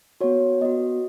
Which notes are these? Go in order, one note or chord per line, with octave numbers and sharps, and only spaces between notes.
B3 F#4 C#5
B3 F#4 D#5